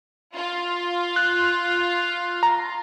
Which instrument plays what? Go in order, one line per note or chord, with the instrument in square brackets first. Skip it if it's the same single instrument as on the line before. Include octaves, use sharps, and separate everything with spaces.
[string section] F4
[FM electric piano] F#6
A#5